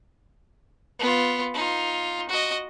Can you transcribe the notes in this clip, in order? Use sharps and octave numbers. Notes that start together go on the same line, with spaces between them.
B3 F4
D#4 F4
F#4 D#5